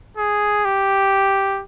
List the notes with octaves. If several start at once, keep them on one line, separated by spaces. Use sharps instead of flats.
G#4
G4